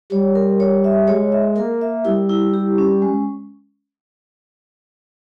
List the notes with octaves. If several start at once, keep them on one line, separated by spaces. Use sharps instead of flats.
G3 C#5
A#4
C#5
E5
G#3 C#5
E5
A#3 A#4
E5
G3 E4
E4
G4
C#4
G#3